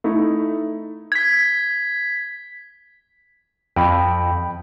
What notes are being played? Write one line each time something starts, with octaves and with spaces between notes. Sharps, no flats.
A3 D#4 E4
G#6 B6
F2 G5 B5